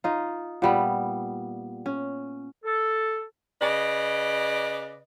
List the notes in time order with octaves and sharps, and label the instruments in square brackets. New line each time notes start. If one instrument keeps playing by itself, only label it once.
[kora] D#4 F4
A#2 G3 B3
C#4
[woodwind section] A4
[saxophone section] C#3 B4 D5 D#5